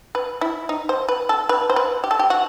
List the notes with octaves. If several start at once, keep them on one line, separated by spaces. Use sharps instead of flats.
B4
E4
D#4
C5
B4
A4
B4
C5
B4
G4
A4
G4
F#4